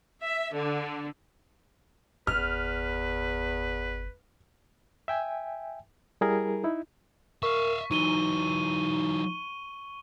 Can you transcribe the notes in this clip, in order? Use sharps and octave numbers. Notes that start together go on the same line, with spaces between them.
E5
D3
G1 E2 B4 F6
E5 G5 G#5
G3 E4 G#4 A#4
D#4 E4
A#4 E5 F5 C#6
E3 F#3 D#4 C#6 D#7 G7